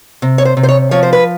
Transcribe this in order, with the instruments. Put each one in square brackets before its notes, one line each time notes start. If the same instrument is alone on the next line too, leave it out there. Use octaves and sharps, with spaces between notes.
[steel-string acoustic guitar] C3
C#5
C5
C3
C5
C#5
F3 C#5
C5
B4